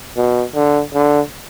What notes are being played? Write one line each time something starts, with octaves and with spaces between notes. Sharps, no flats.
B2
D3
D3